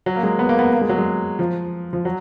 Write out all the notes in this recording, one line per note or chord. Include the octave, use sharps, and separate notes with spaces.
F#3
A#3
G#3
B3
A#3
B3
A#3
G#3
F#3
G#3
F3
F3
F#3